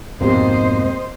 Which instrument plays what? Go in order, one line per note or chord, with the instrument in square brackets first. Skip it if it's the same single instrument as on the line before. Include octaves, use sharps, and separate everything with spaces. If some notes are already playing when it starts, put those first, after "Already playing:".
[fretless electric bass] F2 G#2 B2 [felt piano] A#3 C4 G4 [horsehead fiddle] C5 D#5